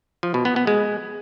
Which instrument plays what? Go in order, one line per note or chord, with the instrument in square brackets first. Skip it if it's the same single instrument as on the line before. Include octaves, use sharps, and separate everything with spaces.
[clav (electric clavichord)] F3
B2
B3
B3
G#3